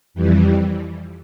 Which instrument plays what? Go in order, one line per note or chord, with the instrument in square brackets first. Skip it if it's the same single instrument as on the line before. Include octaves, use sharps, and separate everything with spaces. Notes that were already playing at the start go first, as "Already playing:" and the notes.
[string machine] F2 E3 G3